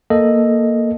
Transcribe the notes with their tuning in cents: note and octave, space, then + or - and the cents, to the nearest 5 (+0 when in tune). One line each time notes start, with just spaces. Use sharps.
A#3 +0 A4 +0 D#5 +0